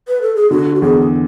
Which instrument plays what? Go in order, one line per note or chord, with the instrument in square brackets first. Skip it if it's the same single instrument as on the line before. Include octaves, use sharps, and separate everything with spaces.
[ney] B4
A4
G#4
[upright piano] D3 [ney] F#4
[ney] F#4
[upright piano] E2 [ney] G#4